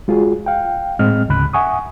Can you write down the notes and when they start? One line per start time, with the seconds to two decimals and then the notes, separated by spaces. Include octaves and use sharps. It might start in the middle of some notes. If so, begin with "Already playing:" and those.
0.08 G#3 F4 F#4 G#4
0.46 F5 G5
0.99 A2 G#3 C4 D#5 F6
1.29 D2 G#2 C#3 B5 F#6
1.53 E5 F#5 G#5 C#6 D#6